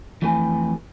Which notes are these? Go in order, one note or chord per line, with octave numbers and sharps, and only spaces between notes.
F2 E3 A3 G4 B4 G#5